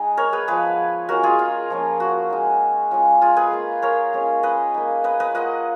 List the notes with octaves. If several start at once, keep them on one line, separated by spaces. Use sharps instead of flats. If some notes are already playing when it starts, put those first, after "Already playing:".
Already playing: G#3 D#4 D#5 F#5 G#5
A#4 C#5
G#4 B4
F3 B3 F4 G#4 B4
G#3 C#4 F4 F#4 A#4
F4 G#4
F4
F3 A#3 C#4
F#4
G#3 D#4
G#3 C#4 F4
F4 G#4
G#4 B4
A#3 F4
A#4 C#5
G#3 C#4 F4
B4 D#5
A#3 D#4
B4 D#5
B4 D#5
A#3 F4 D#5 F#5